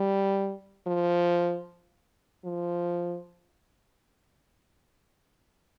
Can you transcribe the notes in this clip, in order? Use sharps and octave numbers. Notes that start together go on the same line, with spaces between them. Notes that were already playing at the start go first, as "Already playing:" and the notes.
Already playing: G3
F3
F3